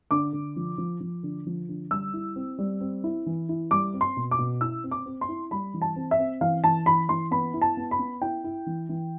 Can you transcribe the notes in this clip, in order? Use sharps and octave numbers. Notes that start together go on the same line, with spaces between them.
D3 D6
D3
F3
F3
F3
D3
F3
D3
G3 E6
E4
C4
G3
C4
E4
E3
E4
G3 D6
C4
C6
B2
D6
B2
E4 E6
C4
D6
C4
C6
E4
G3 B5
E3
A5
C4
E5
C4
E3 F5
E3 A5
E3 B5
E3 C6
B3 B5
E4
A5
B3
B5
B3
E4 G5
E4
E3
E3